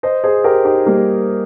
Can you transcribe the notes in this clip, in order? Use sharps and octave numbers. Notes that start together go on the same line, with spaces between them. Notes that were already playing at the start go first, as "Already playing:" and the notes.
C5 D#5
G#4 C5
G4 A#4
D#4 G4
G3 A#3